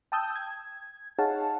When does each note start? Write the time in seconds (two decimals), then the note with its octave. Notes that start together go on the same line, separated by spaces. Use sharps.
0.12 G5 A5 D#6 E6 G6
0.36 G#6
1.19 D#4 G#4 C#5 F5 F#5 A5